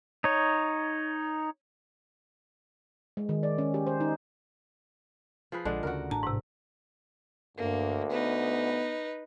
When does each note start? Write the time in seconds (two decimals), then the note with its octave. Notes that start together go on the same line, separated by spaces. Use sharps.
0.24 D#4 C#5
3.17 G#3
3.29 D#3
3.43 D5
3.58 C#4
3.74 G4
3.87 C5
4.00 D#4
5.52 F3 G#4 B4
5.65 A#1 D3 F3 G#3 D4
5.83 D2 C#3 F#4 A#4
6.11 A1 A2 D4 A5 A#5
6.23 G#2 C3
7.57 D2 G2 A#3
8.10 B3 D#4 B4